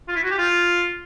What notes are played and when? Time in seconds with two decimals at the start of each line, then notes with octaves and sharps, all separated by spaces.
0.08 F4
0.16 E4
0.23 F#4
0.31 G4
0.38 F4